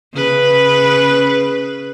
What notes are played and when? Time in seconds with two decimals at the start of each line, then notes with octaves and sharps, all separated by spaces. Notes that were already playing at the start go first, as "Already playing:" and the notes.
0.14 C#3 B4